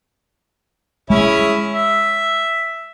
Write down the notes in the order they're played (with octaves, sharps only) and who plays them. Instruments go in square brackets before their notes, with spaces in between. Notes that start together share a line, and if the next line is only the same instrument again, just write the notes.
[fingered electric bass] G#3 [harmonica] C#4 E4 G#4
[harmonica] E5